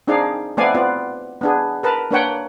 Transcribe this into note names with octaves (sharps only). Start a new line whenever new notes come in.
C4 D4 D#4 G#4 D5 F5
A3 B3 C4 D5 F5 G#5
B3 C4 F4 D5
B3 D4 G#4
A#4 B4 A5 B5
A#3 D4 B4 C#5 F#5 G5